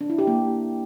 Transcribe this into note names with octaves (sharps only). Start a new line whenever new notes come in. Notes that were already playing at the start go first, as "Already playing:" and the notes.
D4
E4
G4
A#3